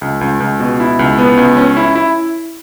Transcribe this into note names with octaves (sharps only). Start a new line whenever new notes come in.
C#2
C#2
C#2
B2
E4
C#2
B3
C#2
C#4
E4
E4